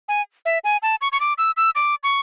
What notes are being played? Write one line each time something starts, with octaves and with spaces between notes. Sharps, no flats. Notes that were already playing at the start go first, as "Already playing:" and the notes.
G#5
E5
G#5
A5
C#6
C#6
D6
E6
E6
D6
C#6